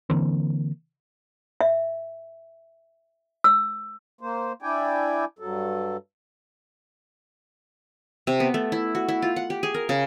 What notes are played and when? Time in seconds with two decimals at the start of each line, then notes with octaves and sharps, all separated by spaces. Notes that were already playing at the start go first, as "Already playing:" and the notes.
0.10 D3 E3 A#3 C4
1.61 E5
3.44 E6
4.21 A#3 C5
4.62 D4 E4 D5 G5 G#5
5.39 G2 F#3 A4
8.27 C3
8.40 B3
8.54 A3
8.72 E4
8.95 F#4
9.09 E4
9.22 F4
9.36 F#5
9.50 G4
9.63 G#4
9.74 A#4
9.89 C#3